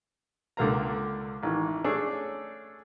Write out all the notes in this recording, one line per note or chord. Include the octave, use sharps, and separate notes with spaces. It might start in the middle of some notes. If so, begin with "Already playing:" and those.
C#2 D3 A#3 A#5
A1 D#3 E3
A3 C#4 D4 G#4 A4